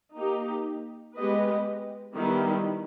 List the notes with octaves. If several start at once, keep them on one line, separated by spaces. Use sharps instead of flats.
A#3 D#4 G4
G#3 B3 G4 B4 D#5
D#3 G3 B3 E4